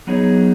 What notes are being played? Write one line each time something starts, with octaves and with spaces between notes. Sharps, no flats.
F#3 B3 D#4 G#4 C#5